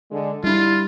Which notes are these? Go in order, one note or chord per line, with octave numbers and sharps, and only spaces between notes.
D3 G#3
G3 D4 E4 F4